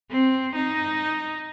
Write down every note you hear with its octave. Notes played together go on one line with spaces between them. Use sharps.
C4
D#4